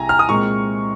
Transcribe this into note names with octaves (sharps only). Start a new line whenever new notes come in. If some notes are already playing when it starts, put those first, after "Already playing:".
Already playing: C2 C3 G#5 A#5
F6
D#6
A#2 G#3 C4 C#6